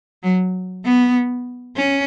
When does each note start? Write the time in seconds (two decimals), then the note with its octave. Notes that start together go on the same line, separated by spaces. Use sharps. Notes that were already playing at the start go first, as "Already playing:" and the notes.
0.23 F#3
0.85 B3
1.76 C#4